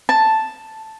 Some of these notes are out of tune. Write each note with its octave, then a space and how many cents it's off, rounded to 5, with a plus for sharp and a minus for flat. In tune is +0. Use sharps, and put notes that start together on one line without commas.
A5 +0